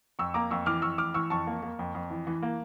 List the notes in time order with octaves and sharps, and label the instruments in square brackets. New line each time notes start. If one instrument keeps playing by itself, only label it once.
[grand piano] F2 C#6 E6
A#3 A#5 D6
F2 C#6 E6
E3 D6 F6
F2 C#6 E6
E3 D6 F6
E3 C#6 E6
F2 A5 C#6
A#3
A#3
F2
F2
E3
E3
A#3